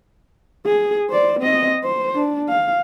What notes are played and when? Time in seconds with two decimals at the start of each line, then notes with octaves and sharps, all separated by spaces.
0.66 G#4
1.10 C5 D5
1.39 C4 D#5
1.84 C5
2.15 D4
2.49 F5